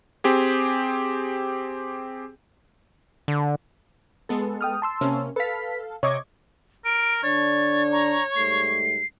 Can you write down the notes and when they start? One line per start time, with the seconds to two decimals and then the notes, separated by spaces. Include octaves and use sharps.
0.24 C4 G4 G#4
3.28 D3
4.29 G#3 B3 A4
4.61 G5 D#6 F6
4.82 A5 C6 E6
5.01 C3 A#3 C#4
5.36 A4 B4 F5 B6
6.03 C3 C#5 D#5 C#6 D6 G#6
6.85 A#4 D7
7.23 D3 D4 C#5 A6
7.92 A#5
8.36 G#2 G3 A3 C7